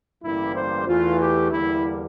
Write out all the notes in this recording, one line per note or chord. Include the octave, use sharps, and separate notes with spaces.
A1 G2 D3 G3 A#3 E4
C5
E2 E3 A3 F4
G4
E2 D3 G3 A#3 E4